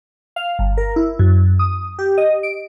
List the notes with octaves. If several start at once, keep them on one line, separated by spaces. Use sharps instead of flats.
F5
G1
A#4
E4
F#2
D#6
G4
D#5
D7